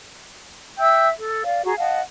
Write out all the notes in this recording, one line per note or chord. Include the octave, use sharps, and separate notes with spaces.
E5 G5 E6 G6
A4
D5 F5
F#4 G#4 A#5
D#5 F5 F#5 A5